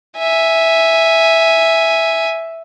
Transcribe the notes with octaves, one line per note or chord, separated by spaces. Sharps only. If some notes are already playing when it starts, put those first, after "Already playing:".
E5 G#5